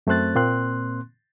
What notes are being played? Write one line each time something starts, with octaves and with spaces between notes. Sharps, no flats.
F#2 A3 C4 C5 F#6 A6
A#2 A#3 C4 C6 F#6